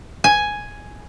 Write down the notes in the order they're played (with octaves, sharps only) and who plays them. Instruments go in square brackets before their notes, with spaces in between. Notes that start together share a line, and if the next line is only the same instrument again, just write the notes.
[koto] G#5